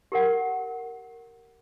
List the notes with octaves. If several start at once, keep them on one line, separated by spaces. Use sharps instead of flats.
G4 A#4 F#5